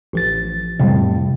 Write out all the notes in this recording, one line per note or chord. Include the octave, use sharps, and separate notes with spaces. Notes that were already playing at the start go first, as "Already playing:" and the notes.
A1 F3 A6
F2 A2 C3 G3